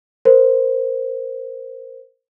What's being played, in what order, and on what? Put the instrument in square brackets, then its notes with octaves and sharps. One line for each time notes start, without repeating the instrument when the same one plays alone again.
[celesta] A#4 C5